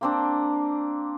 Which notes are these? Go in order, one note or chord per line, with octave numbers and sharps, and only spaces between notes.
A#3 C4 D4